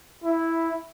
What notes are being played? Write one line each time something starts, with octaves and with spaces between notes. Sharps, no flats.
E4